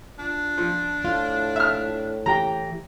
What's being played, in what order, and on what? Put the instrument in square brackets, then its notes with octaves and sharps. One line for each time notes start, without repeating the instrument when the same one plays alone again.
[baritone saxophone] D4 [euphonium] F4
[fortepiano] F3
[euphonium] A2 [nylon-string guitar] F4
[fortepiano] E5 F6
[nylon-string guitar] E3 G4 G5 [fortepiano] A#5